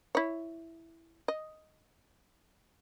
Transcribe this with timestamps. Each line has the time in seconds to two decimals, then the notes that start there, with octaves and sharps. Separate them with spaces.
0.15 E4 C#5
1.28 D#5